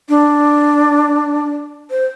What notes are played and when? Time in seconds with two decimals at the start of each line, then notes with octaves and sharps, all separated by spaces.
0.09 D4
1.91 C5